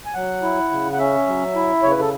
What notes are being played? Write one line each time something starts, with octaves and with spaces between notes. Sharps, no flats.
G#5
F#3 F#5
E4
C#3
F#5
C#4 E5
F#3
E4
C#3 C#5
B4
A4